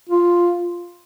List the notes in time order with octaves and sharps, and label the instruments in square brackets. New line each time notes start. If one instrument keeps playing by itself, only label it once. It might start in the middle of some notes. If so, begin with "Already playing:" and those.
[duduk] F4